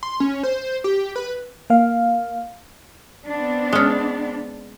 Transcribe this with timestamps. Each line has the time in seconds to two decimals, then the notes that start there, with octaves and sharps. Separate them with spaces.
0.03 C6
0.20 C#4
0.43 C5
0.84 G4
1.16 B4
1.70 A#3 F5
3.29 B3 C4 D4
3.73 G#3 C#4